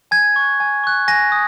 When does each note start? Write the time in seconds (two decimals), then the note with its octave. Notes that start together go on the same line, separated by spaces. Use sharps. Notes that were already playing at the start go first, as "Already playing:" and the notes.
0.11 G#5 G#6
0.36 C#6 F#6
0.60 G#5
0.84 C#6 F#6
1.08 G#5 A#6
1.32 D#6